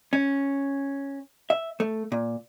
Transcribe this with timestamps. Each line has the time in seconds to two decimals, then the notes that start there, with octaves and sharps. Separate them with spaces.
0.13 C#4
1.50 E5
1.80 A3
2.12 A#2